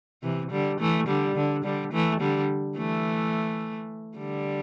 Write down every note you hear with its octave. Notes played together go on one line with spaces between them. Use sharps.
C3 E3
D3 G3
E3 A3
D3 G3
D3
D3 G3
E3 A3
D3 G3
E3 A3
D3 G3